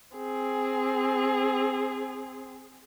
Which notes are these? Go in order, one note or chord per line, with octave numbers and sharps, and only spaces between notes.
C4 G#4